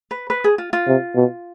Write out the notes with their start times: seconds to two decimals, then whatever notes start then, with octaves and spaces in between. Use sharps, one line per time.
0.11 B4
0.30 B4
0.44 G#4
0.58 F4
0.73 F4
0.87 C3
1.16 B2